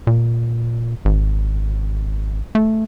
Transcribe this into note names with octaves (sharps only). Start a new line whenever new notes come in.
A#2
G#1
A3